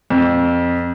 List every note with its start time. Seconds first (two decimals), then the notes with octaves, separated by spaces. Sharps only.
0.10 F2